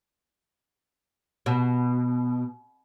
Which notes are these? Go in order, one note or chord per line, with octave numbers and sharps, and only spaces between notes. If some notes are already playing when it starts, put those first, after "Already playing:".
B2